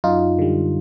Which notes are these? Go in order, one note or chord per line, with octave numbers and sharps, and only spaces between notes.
F#2 D#4 F4
D3 G3